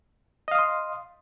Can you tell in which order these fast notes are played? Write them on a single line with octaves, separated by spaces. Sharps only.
D#5 F5 D#6 C6